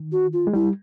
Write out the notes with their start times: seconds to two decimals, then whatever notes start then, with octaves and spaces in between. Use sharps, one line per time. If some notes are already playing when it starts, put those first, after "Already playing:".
Already playing: D#3
0.12 F#4
0.33 F4
0.47 G#3
0.53 G3 E4